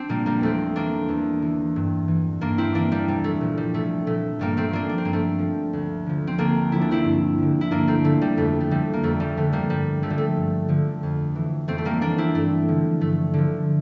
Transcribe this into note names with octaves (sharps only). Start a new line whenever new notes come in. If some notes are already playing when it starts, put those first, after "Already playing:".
Already playing: C4 D4
A#2 F3 G3 A#3
G3 A#3
E2 A3 C4
E3 A#3 D4
E2
E3
G2
E3
G2 A#3 D4
C4 E4
E3 A#3 D4
G3 A#3
C2 G3
A3
A#2 F3
G3
C2 A3
A#2 F3 A3
G2 G3 A#3
A3 C4
F3 A#3 D4
D4
C4
G2 A#3
A3 C4
F3
D2
D3 F3
C4
D2 A#3 D4
D3 F3 E4
D4
C4 E4
G2
D3 F3
E4
G2 A#3 D4
A3 C4
D3 F3 A3
G3
F2 A3
A3
D3 F3 G3
A#3
F2 A3
G3
D3 F3 A3
G3 A#3
G2 G3
D3 F3 A3
G3
A3
G2
D3 F3
F2
E3
F2 A3 C4
A3
G3 A#3
E3 A#3 D4
C4 E4
G2 A3
D3 F3
G2 A3
D3 F3